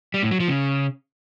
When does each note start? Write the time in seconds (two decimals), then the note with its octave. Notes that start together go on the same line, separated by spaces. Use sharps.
0.14 G3
0.23 A2
0.31 F#3
0.40 F3
0.49 C#3